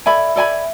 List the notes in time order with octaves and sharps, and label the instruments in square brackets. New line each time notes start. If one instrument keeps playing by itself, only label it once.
[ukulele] A4 D5 G#5 B5 [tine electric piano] E5
[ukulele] A4 D5 G#5 B5